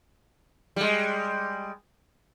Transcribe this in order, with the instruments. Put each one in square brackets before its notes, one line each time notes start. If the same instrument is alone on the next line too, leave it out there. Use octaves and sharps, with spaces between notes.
[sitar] G3 G#3